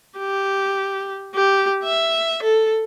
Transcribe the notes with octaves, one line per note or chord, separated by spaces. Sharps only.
G4
G4
E5
A4